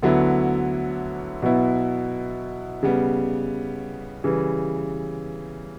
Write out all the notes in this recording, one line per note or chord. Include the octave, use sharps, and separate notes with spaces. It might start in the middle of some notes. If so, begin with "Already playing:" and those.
D2 D3 F#3 B3 E4
B2 F#3 B3 E4
C#3 G3 B3
C#3 E3 G3